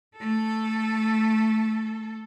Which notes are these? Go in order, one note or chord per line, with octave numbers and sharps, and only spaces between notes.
A3 A4